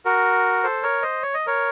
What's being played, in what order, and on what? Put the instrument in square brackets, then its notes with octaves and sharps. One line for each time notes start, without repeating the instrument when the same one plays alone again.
[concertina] F#4 A#4
A4 C5
A#4 C#5
C5 D#5
C#5
D#5
A#4 C#5